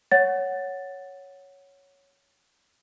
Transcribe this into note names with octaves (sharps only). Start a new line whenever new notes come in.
C#5 F#5 A6